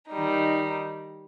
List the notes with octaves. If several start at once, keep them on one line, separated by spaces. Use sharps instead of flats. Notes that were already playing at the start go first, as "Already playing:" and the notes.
D#3 G3 D#4